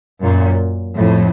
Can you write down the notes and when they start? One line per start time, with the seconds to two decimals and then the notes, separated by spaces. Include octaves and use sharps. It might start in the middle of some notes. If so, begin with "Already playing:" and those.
0.22 F#2 A#2
0.96 F2 A2